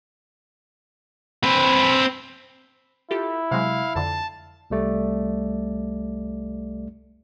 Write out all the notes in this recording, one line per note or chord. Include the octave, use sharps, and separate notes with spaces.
C4 B4
E4 F4 G4 A4
C3 F#3 G#3 F5
F2 D3 A5
C2 G3 A3 D5